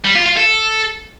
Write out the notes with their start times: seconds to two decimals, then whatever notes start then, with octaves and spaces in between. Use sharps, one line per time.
0.05 G3
0.15 F4
0.26 F4
0.37 A4